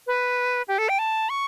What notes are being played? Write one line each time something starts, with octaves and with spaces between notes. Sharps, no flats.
B4
G4
A4
G5
A5
C#6